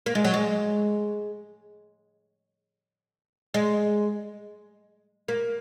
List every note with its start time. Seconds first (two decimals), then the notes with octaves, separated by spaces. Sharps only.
0.06 A#3
0.15 G#3
0.24 F#3
0.34 G#3
3.54 G#3
5.28 A#3